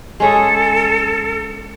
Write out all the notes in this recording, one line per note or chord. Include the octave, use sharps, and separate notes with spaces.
G#3 C#4 G#4 A4